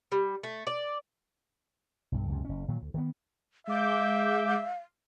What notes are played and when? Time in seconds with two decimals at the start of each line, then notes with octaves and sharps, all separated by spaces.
0.12 G3
0.43 A3
0.67 D5
2.12 B1 G2
2.28 C#2 F#2 C3
2.45 F#1 C#4
2.68 A#2 D#3 F#3
2.82 D2
2.94 D#3 F#3 B3
3.67 G#3 E5 F5 D6 G6